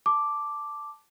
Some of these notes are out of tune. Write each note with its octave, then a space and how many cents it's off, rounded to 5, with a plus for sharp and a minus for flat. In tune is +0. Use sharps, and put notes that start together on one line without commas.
A5 +0 D6 +0